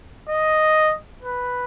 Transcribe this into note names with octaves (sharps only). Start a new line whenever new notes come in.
D#5
B4